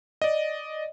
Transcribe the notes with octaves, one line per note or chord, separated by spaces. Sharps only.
D5 D#5